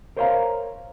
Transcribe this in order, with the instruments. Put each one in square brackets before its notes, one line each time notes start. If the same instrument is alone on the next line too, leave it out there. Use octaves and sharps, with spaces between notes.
[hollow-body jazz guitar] A#4 C5 C#5 D#5 F5 A#5